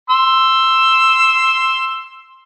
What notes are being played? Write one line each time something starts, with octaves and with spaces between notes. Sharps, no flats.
C6 E6